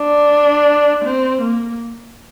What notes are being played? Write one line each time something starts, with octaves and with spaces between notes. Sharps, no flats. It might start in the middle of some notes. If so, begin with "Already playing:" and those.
Already playing: D4
C4
A#3